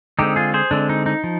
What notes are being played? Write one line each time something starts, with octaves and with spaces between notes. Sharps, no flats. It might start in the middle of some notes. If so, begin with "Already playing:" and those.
D3 G#3 C4 D#4 G4
F4 G#4
G#4 C5
D3 G#3 C4 D4
D#4
D#4
F3